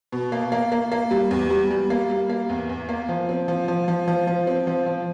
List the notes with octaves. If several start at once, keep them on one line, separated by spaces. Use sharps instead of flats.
B2
A#3
A#3
A#3
A#3
G3
E2
G3
G3
A#3
G3
A#3
E2
E2
A#3
F3
C4
F3
F3
F3
F3
F3
C4
F3
F3